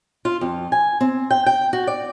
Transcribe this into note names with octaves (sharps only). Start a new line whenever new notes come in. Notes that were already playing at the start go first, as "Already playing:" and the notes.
F4
F2
G#5
C4
G5
G5
F#4
D5